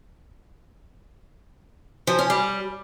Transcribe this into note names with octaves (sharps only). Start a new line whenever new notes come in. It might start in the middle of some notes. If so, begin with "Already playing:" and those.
F3
C#4
G3